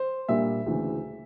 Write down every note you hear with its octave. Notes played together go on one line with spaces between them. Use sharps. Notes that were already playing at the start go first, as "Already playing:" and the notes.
Already playing: C5
A#2 G3 A#3 D4 E5
D2 C#3 E3